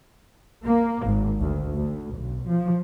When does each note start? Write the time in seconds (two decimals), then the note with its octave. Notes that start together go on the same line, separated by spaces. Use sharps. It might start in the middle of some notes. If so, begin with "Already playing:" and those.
0.64 A#3
1.06 G#1
1.38 D2
1.75 D2
2.14 B1
2.48 F3